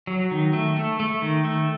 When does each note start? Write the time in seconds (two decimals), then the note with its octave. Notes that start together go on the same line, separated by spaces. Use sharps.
0.07 F#3
0.31 D#3
0.53 A3
0.77 A3
1.00 A3
1.22 D#3
1.45 A3